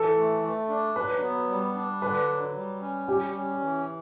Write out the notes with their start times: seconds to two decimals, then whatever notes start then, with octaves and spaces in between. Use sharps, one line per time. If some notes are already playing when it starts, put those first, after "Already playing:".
Already playing: E3 A4
0.16 A3
0.44 A3
0.69 D4
0.96 F#3 B4
1.22 B3
1.49 G3
1.75 D4
2.01 D3 B4
2.28 F#3
2.55 G3
2.81 C#4
3.08 G3 G4
3.34 C#4
3.61 E3